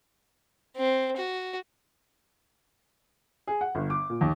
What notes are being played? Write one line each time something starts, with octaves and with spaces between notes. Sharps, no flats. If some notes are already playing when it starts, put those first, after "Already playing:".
C4
F#4
G#4
F#5
G1
D6
A#2
D#2